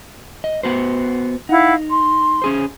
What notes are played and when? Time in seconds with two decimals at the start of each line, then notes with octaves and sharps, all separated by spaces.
0.44 D#5
0.63 B3 F#4 C5
1.49 D#4 E4 F5 F#5
1.90 C6
2.42 C#4 G#4 C5